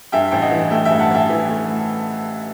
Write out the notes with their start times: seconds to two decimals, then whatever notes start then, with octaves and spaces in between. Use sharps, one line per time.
0.12 G2 E5 G5
0.31 A1 G5
0.41 D#5 F#5
0.51 E3
0.70 A3 E5 G5
0.85 E5 G5
0.91 G2
1.00 F#5 A5
1.10 A1 E5 G5
1.30 E3
1.49 A3